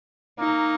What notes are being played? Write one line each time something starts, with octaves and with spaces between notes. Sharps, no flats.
A#3 D#4